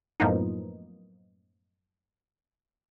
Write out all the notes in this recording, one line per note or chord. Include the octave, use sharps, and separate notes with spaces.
F#2 A2 F3 A#3 B3 D#4